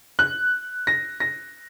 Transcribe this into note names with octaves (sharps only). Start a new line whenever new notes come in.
F#6
A#6
A#6